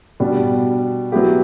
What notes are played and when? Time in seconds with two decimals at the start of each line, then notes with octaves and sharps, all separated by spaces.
0.20 B2 G3 D4
1.12 F#3 B3 E4 G4